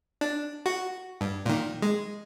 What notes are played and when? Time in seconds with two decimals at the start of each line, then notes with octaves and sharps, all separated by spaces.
0.21 D4
0.66 F#4
1.21 G2
1.46 A#2 D#3
1.82 G#3